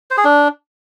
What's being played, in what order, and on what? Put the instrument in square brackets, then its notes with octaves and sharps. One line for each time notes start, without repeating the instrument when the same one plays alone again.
[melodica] C5
G#4
D4